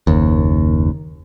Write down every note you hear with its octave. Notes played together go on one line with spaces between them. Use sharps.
F#1 D#2